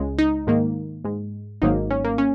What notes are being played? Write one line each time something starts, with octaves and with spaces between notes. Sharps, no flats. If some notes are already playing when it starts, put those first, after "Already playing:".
Already playing: C#2 C#3 G#3
D#4
G#2 D#3 A#3
G#2 G#3
G#1 G#2 D#3 F#3 A#3 D#4
C#4
A#3
C#4